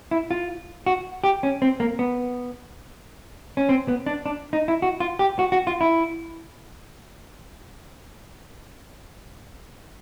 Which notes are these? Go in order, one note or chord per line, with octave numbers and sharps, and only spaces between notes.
E4
F4
F#4
G4
C#4
C4
A#3
B3
C#4
C4
B3
D4
D4
D#4
E4
F#4
F4
G4
F#4
F#4
F4
E4